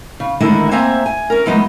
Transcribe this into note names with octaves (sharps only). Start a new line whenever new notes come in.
C#3
D3 D#3 G#3 A3 E4 A#4
A#3 C4 C5 E5 G#5 A#5
G#5
C#4 A#4
E3 F#3 G#3 A3 B3 D#4